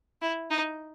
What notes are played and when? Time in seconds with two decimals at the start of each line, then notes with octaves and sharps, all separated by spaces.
0.22 E4
0.50 D#4